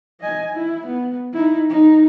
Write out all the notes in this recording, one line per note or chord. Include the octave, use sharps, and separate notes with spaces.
D#5 G#5
E4
B3
D#4 E4
D#4